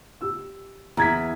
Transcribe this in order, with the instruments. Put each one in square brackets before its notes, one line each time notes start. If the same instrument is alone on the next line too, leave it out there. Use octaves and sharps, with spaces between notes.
[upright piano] G4 E6
[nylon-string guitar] E2 [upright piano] A#5 G#6 B6